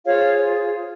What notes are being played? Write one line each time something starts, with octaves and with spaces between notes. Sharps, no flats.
F4 G#4 C5 C#5 F5